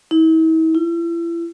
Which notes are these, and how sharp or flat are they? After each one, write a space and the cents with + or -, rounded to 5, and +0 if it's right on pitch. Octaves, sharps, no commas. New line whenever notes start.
E4 -45
E4 +35